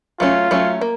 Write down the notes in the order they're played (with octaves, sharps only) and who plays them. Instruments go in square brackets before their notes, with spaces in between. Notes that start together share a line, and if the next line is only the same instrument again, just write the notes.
[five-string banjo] F#3 A3 C#4 [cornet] F4
[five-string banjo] F#3 A3 C#4
A#3